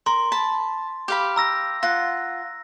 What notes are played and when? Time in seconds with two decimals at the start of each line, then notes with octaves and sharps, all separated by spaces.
0.06 A#4 C6
0.32 A5 B5
1.08 G4 F5 B5
1.36 A#5 E6 A#6
1.83 F4 F#5 A#6